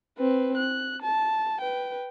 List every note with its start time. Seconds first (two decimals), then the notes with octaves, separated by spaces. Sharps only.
0.18 C4 B4
0.57 F#6
1.02 A5
1.60 B4 G5